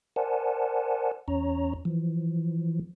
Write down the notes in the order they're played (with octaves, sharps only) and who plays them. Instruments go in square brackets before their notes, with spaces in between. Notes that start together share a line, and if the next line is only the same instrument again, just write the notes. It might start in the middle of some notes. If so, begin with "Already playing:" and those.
[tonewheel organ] A#4 C5 D5 F#5 G#5 A5
E2 C#4 C#5 A#5
E3 F3